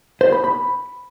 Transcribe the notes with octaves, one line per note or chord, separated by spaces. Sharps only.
C5
B5
B5